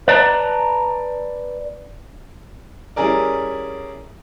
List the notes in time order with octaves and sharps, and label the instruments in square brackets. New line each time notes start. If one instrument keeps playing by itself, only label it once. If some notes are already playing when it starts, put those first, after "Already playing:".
[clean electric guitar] B4 D5 A5 A#5
[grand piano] G3 C#4 E4 G#4 A#4 D5